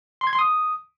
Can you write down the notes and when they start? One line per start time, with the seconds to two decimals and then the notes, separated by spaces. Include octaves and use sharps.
0.21 C6
0.27 G#6
0.33 C6
0.39 D#6